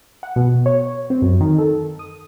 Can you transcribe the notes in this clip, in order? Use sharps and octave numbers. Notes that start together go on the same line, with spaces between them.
F#5
B2
C#5
C4
F#2
D#3
A4
D#6